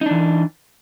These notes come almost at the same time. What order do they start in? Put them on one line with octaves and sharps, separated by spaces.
D#4 D4 E3